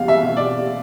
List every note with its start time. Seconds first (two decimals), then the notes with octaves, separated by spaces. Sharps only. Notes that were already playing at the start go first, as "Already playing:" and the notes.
Already playing: E2 B2 F5
0.08 E5
0.23 B2
0.37 D5